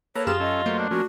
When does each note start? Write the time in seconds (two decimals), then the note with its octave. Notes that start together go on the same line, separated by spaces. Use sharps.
0.15 A#3 A4 B4 C#5 A#5
0.27 F#2 F4 G4 G#4 E7
0.40 C#4 A4 D#5
0.66 F#3 A3 A#3 C5
0.79 D4
0.91 F3 A#3 C#4 F#4